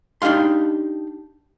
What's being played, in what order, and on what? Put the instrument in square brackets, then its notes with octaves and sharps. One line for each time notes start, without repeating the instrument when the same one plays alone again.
[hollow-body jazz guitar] D4 D#4 G4 F5 C6